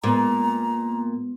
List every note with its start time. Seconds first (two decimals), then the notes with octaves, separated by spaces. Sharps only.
0.04 A#2 G#3 B3 A#5